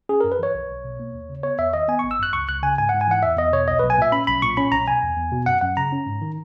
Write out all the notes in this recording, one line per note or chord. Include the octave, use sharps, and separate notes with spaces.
C#4 G#4
F#2 A#4
B4
E3 C#5
B1
B1
B2
A#3
D#2
C#3
B3 C#5
E2 E5
D#3 D#5
B3 G#5
G#1 C#6
E6
F#2 F#6
C#2 C#6
C#2 F#6
C#3 G#5
G#2 G#5
G#2 F#5
G#5
E3 F#5
E2 E5
E2 D#5
B2 C#5
B1 D#5
B1 B4
G#5
A#2 E5
C#4 B5
B1 B5
A#2 C#6
C#4 B5
B1 A#5
B2 G#5
E2
E2
B2
F#2 F#5
F#2 F#5
C#3 A#5
C#4
G#2
D#3